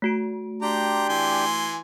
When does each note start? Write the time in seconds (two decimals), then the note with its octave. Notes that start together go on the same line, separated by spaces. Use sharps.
0.02 A3 F#4 D7
0.62 D4 G4 G5 A#5 C6
1.09 E3 G#5 C6